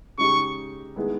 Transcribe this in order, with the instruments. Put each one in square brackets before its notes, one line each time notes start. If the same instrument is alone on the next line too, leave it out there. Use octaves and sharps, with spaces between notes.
[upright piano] C#3 G#3 D#4 G4 [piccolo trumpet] C#6
[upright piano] D#3 G#3 B3 E4